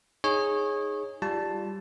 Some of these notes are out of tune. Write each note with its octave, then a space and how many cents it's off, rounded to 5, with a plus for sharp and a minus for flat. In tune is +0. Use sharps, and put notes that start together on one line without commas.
D#4 +0 G#4 +0 C#5 -20
G3 +0 F4 -15 A5 +0